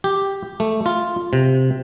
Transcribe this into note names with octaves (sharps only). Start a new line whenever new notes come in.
G4
A3
F4
C3